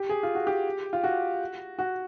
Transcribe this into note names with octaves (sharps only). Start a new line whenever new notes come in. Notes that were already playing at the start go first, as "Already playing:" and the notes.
Already playing: G4
G#4
F4
F#4
G4
F4
F#4
F#4